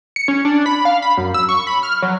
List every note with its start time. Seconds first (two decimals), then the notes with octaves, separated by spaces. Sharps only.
0.16 C#7
0.28 C#4
0.45 D4
0.66 B5
0.85 F5
1.02 B5
1.17 F#2
1.34 E6
1.49 C#6
1.67 B5
1.83 F6
2.02 F#3